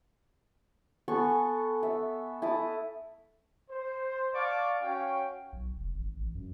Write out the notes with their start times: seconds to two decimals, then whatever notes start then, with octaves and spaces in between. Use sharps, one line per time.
1.08 B3 A4 G#5 C#6
1.83 E5
2.42 E4 A5 D#6
3.69 C5
4.33 D5 F5 A5 C#6 D6
4.82 C#4 F#4 C#5 F5 G5
5.53 B1
5.75 F1
5.95 G#1
6.17 A1
6.35 F#2